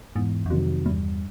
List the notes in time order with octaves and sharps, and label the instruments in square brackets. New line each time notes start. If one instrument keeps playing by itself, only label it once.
[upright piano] E2 [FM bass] G#2
[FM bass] F#2
[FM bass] F2 [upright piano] C3 D#3 F#3
[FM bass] E2 [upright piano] G2